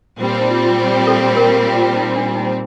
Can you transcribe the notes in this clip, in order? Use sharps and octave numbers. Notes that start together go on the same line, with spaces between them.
A#2 G3 C4
C5
D#4
F4
F4
G4
A4
A#4
G4
F4
D#4
D4
D#4